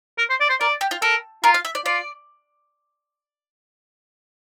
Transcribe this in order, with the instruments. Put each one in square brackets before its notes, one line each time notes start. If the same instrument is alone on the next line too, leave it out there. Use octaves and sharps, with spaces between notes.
[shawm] A#4
C5
D5
C5
[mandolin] A#4 [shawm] D5
[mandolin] G4
F4
[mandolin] A4 [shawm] A#4
[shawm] F4 [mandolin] A#4
[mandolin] F5
E5
D5
[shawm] F4 [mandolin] D5